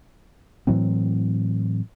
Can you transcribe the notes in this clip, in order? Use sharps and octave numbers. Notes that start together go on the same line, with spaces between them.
A2 E3 F#3 C4